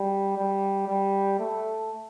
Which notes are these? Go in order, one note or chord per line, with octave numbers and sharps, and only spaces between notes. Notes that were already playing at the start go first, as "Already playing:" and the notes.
Already playing: G3
G3
G3
A3